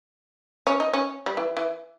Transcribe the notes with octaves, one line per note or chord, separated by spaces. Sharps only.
C#4
D#4
C#4
G3
E3
E3